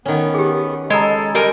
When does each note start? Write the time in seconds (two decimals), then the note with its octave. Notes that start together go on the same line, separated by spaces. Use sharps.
0.06 D#3 B3 C#4
0.34 G4 G#4
0.90 G#3 A4 D#5 A#5
1.35 G3 G#3 A#4 G#5